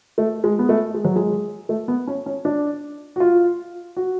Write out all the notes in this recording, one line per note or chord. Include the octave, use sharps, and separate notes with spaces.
A3
G#3
B3
A3
G#3
F#3
G#3
A3
B3
C#4
C#4
D4
F#4
F4
F#4